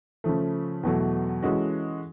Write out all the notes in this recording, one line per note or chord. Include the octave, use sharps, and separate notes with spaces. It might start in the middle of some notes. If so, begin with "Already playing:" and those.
C#3 F3 A3
E2 B2 F#3 A3
E3 G#3 C#4 F#4 A4